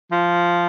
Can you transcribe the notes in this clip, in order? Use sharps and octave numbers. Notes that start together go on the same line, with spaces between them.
F3